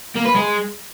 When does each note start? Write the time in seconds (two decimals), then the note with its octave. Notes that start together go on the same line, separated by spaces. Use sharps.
0.16 A#3
0.26 B4
0.35 G#3